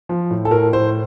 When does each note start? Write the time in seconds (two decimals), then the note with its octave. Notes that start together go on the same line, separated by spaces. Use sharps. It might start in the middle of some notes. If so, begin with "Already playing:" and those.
0.09 F3
0.31 A2
0.45 A4
0.51 A2 A#4
0.73 A2 C5